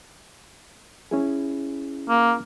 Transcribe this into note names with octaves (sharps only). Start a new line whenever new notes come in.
C#4 E4 G#4
A#3